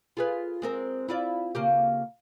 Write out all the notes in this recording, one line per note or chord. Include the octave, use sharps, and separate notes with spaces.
F4 G#4 B4
G#3 C4 A#4
E4 F4 D5
C#3 A#3 G4